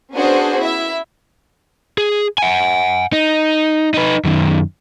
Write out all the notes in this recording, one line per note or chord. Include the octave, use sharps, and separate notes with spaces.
B3 C#4 D4 F#4 G#4 C5
E4 E5
G#4
F#5 G#5
D#4
D#4 B4
F#2 D#3